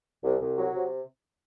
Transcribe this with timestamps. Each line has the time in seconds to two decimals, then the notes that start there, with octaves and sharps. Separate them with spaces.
0.23 C2
0.40 C2
0.56 F#3
0.73 C3